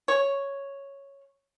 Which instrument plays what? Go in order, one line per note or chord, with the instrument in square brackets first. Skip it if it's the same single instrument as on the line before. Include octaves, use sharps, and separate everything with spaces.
[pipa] C#5